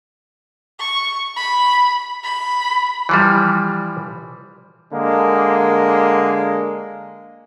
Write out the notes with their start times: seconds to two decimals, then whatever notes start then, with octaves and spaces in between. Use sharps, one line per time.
0.79 C#6
1.36 B5
2.24 B5
3.09 E3 F3 G3
4.92 D3 G#3 A#3